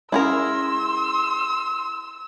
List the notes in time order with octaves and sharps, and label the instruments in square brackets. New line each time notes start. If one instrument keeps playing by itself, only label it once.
[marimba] G#3 C#4 F#5 [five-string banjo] E4 G#4 A#4 [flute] C6 [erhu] E6